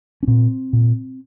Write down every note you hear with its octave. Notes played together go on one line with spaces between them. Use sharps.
C#4
A#2 C4
A#2